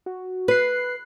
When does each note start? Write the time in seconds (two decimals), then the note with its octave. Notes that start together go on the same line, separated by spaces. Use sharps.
0.06 F#4
0.48 B4 F#6 C7